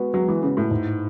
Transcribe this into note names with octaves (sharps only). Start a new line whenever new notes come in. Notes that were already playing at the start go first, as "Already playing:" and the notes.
Already playing: G#3 B3 F#4 B4
F#3 G#3
E3
C#3 B3 F#4 B4
A2
G#2